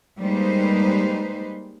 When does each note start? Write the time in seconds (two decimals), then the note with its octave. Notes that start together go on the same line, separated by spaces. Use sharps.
0.19 G3 G#3 A#3 D#4 B4 C5